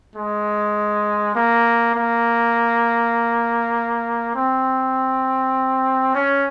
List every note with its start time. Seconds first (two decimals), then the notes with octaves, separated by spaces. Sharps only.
0.15 G#3
1.35 A#3
1.95 A#3
4.35 C4
6.14 C#4